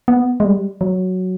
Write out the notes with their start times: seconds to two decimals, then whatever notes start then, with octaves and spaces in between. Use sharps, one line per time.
0.08 B3
0.40 G#3
0.45 G3
0.81 F#3